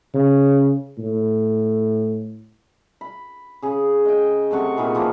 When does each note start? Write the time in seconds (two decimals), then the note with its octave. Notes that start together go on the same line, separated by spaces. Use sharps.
0.14 C#3
0.99 A2
3.01 B5
3.62 C#3 G#4
4.05 D#5 G5
4.51 C3 A3 F#5 C#6
4.77 A#2 D#3 E4 G#4
4.95 E3 F3 A#3